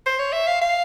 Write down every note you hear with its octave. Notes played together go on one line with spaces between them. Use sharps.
C5
C#5
E5
F5
F5